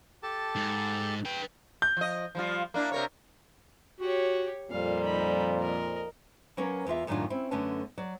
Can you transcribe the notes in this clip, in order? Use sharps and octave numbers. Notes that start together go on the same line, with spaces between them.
G4 A4 A5
G#2
B4 G5
G6
F3 D#5
F3 G3 F4
A#3 D4 E4
C3 A#4 C#5
F#4 G4 C#5
F2 A#2 G3 F5
D#4 B5
A#4 D#5
F#3 A#3 C#4 A#4 B4
E2 A#3 F4 E5
F#2 A2 D#3 F#3 D4 F4
C4 C#4 E4
F#2 D3 A3 B3 C#4 A5
F#3 D5